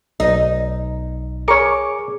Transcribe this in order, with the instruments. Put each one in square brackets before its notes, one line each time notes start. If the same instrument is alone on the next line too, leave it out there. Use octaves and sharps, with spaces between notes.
[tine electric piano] B1 [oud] D#4
[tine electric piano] G#4 D6 C#7 [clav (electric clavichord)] A#4 C#5